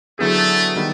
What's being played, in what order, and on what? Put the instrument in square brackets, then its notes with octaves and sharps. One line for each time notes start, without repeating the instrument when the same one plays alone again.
[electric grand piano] D3 F#3 B3 E4 G#4 [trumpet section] A3
[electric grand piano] D#3 G3 B3